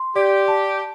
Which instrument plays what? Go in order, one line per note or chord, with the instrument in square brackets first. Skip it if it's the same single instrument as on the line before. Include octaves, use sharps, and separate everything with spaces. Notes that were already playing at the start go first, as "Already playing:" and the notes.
Already playing: [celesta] C6
[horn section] G4 [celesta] D5
[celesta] A5